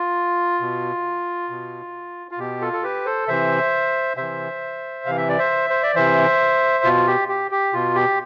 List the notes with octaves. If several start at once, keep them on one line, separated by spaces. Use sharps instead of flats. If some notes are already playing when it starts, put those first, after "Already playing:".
Already playing: F4
B2
B2
F4
B2 G4
F4 A4
A4
G4 B4
A4 C5
C3 E3 C5 E5
C3 E3 C5 E5
C3 E3 F5
E5
D5
C5 E5
C5
D5
C3 E3 C5 E5
B2 F4
G4
G4
G4
B2 F4
G4